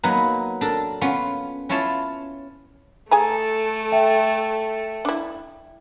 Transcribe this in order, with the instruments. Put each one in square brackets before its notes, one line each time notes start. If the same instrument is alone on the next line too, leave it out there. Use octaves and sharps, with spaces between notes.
[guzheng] F#3 A#3 B3 D#4 A#4 B4
D4 A4 A#4
B3 C#4 F4
C#4 E4 F4 C#5 F5 A5
[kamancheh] A3 A4 [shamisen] G#4 G#5 A#5
[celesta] E5 G5
[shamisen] D4 E4